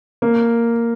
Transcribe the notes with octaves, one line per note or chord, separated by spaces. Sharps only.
A#3